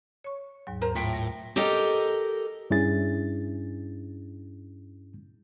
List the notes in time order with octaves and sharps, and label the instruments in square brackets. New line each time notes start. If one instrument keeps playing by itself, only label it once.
[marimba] C#5 C#6
D#2 G#2 F#3
[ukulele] A#4 C5 A#5
[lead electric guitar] A2 [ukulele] F4 E5 G5
[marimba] A#6
[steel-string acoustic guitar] G4 A4 A#4 D#5 G5
[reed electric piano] G2 C#4 D4 E4 G#4 A6